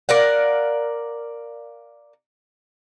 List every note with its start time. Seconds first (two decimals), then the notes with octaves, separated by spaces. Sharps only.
0.09 A#4 D5 F5 F#5